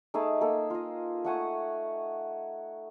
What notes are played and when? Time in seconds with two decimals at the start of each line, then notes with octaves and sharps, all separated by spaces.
0.14 A3 D#4 G#4 A5
0.41 A#3 G#4 A4
0.70 F4 D#5
1.25 A3 F#5 G#5 C#6